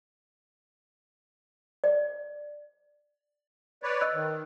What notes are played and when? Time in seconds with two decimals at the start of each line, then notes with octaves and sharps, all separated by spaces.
1.84 D5
3.83 B4 C#5 D5
4.01 D#5 E6 F#6
4.14 D#3